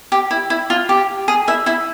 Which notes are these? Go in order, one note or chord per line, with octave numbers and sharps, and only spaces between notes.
G4
E4
E4
F4
G4
G#4
E4 E5
E4 E5